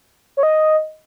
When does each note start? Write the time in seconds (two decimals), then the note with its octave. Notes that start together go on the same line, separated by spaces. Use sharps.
0.37 C#5
0.43 D#5